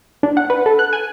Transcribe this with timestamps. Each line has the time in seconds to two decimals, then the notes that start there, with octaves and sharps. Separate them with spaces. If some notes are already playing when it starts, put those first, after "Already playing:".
0.23 D4
0.37 F#5
0.50 B4
0.66 A4
0.79 F#6
0.93 G#5